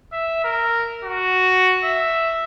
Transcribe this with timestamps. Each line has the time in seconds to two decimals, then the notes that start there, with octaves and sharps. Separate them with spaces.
0.13 E5
0.44 A#4
1.04 F#4
1.84 E5